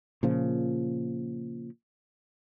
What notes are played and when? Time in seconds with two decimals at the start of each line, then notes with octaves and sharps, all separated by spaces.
0.23 A#2 C#3 F3